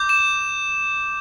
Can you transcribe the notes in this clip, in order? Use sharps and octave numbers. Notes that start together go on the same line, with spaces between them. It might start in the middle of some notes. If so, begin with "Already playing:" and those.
Already playing: D6 G6
E7